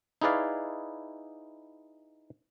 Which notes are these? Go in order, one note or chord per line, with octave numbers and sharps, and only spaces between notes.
D#4 E4 G#4 B4 D5 F5